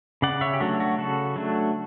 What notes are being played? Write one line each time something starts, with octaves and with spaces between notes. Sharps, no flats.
C#3 D5 F#5
C#5 E5
G4
F#3 A3 D4 F#4
F#4
C#3 F#4 A4
F#3 A3 D4